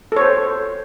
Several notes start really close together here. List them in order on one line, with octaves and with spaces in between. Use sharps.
A4 C#5 C5